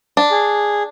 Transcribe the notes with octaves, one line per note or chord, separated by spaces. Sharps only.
D4
G#4